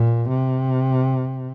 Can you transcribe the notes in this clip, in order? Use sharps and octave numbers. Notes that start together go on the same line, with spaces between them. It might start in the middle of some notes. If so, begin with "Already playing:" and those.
Already playing: A#2
C3